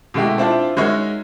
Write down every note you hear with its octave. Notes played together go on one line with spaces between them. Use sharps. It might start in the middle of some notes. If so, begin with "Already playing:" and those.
B2 G#3 A3 E4 G4
C4 D4 E4 F4
G#3 D#4 F#4 A#4 C#5 E5